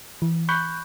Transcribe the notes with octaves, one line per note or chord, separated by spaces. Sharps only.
E3
B5 C#6 F#6 G6